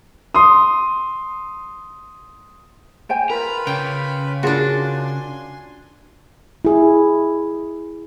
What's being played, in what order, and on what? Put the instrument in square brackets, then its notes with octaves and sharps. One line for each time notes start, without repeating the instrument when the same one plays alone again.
[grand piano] C6 D#6
[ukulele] C5 G5 G#5
[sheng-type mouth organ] F4 B4 B5 [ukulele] A#4 [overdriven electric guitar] A#5
[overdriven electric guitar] C#3 [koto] G5
[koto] D4 F#4 [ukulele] F4 G#4 A#4 [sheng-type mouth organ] G#5 C6
[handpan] E4 G#4